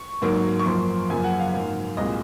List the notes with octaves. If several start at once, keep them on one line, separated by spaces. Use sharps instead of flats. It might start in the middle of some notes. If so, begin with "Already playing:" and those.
Already playing: C#6
G#2 F#3 A#3
C#6
F#2 F3 A#3 C6
F#2 C#3 F3 A#3 G#5
F#5
F5
G#2 F#3 A#3
C2 A#2 G#3 D#5